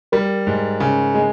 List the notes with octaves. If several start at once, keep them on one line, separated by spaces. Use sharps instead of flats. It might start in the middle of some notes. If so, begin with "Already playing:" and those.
G3 A#4
G#2
C#3
G#3